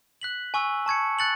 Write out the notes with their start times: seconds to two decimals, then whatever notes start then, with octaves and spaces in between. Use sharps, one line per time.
0.21 F#6 B6 F#7
0.54 G#5 C#6 E6
0.86 A5 C#6 G#6 C#7
1.19 F#6 A6 C#7 F#7